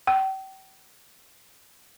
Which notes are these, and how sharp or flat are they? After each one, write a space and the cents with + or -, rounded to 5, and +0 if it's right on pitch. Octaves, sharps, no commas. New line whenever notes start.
G5 -35